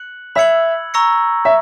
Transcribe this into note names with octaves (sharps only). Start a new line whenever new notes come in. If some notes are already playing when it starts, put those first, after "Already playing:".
Already playing: F#6 C#7 F#7
E5 B5 E6 G#6 C#7 F#7
A#5 C#6 E6 A#6 C#7
E5